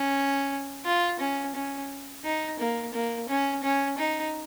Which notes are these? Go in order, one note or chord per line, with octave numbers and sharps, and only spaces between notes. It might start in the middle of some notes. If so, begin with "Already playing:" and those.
Already playing: C#4
F4
C#4
C#4
D#4
A#3
A#3
C#4
C#4
D#4